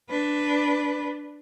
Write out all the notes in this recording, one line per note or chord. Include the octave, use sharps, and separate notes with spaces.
D4 B4